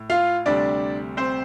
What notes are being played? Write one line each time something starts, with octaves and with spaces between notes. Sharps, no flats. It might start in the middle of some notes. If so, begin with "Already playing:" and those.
Already playing: A2
F4 F5
D2 C3 G3 D4 D5
C4 C5